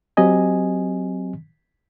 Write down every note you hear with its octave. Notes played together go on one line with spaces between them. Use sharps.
F#3 C4 G4 D#5 G#5